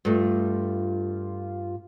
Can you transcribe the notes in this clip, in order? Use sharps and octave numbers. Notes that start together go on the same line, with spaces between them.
G2 A3 F4